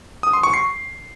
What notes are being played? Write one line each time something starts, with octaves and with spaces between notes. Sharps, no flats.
D#6
C6
C#6
C7